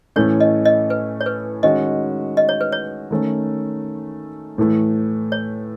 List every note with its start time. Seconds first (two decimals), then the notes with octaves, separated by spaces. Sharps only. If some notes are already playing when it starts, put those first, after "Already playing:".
0.16 A2 E3 A3 C#4 C#5
0.40 D#5
0.65 D#5
0.90 B4
1.21 C#5
1.26 B4
1.63 D#3 G#3 C#4 F#4 D#5
2.37 D#5
2.49 C#5
2.61 B4
2.72 C#5
3.11 D#3 A3 C#4
4.58 A2 E3 A3
5.32 C#5